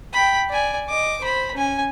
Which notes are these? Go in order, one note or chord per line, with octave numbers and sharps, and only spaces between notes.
G5 B5
D5 G#5
D#5 D6
C5 B5
C#4 G#5